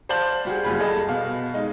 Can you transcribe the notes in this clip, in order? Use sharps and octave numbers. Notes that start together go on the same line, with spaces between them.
C5 D5 F5 A5 G6 F#7
G3 F#4 G#4
F#1 G3 F4 G#4 B5
G#4 A4 D#5 A5
B2 F5
G#3 D#4